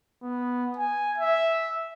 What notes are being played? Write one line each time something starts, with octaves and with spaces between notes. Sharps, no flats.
B3
G#5
E5